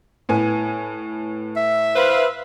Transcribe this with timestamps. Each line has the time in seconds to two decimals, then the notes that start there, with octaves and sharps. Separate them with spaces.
0.29 A2 B3 G#5
1.56 E5
1.96 B4 C5 F5